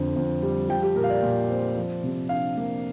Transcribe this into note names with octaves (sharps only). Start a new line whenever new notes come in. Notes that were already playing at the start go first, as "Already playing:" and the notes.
Already playing: F2 D3
F2
G3
F3 G5
G4
A#2 A#4
F5
D5
A#2
C4
F3
C3
D4 F5
A#3